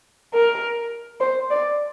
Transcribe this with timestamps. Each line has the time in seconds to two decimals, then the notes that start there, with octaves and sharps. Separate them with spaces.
0.34 A#4
1.20 C5
1.50 D5